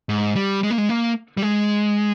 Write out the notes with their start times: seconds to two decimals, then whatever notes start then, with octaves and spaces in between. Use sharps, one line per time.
0.09 G#2
0.36 G3
0.63 G#3
0.70 A#3
0.78 G#3
0.89 A#3
1.37 G3
1.42 G#3